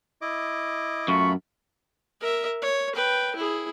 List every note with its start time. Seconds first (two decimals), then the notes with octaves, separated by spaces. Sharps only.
0.22 E4 D#5 D6
1.08 F#2 A3 F4 B5 C#6
2.21 A#4 E5
2.62 C#5
2.95 B4 G5
3.36 E4 G#4